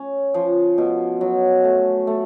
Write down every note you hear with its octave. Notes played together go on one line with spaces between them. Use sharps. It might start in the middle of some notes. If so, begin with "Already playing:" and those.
Already playing: C#4
F3
B2
F#3
A3
A3